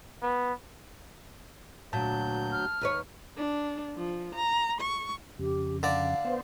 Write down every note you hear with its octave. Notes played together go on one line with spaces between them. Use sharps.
B3
D2 A#2 F#3 A5 G6
F6
D#2 B4 C#5
D4
F3
A#5
C#6
F2 C#3 G4
D3 D5 F5
B3 C5